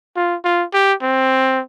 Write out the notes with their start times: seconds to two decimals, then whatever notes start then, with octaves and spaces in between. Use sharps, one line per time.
0.16 F4
0.44 F4
0.73 G4
1.01 C4